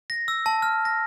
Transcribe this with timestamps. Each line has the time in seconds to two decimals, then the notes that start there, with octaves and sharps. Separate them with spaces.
0.10 A#6
0.28 E6
0.46 A5
0.62 F6
0.85 A#6